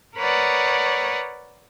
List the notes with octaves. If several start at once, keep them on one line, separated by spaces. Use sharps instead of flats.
A#4 B4 C#5 D5 F#5 D#6